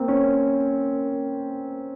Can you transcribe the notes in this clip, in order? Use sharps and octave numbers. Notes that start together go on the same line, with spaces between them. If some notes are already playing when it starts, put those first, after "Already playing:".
Already playing: A#3 C4
C#4